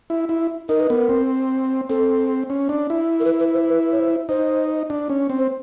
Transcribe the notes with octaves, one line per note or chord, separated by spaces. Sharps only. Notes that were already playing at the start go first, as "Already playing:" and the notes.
E4
E4
D#4 A#4
B4
B3 A#4
C4
C4 A4
C#4
D4
E4
A#4
B4
B4
C5
B4
C#5
C5
D#4 C5
D4
C#4
C4
C5